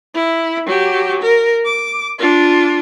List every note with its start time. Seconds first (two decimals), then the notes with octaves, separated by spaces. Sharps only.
0.14 E4
0.66 F#3 G4
1.22 A#4
1.65 D6
2.19 D4 F4